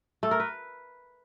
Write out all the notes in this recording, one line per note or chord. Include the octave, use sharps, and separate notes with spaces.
A3
A#4
B4